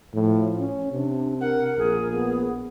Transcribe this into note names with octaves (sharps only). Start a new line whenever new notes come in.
A2 F3
C#4
C3 D4
A#4 F#5
A#1 G#4
B3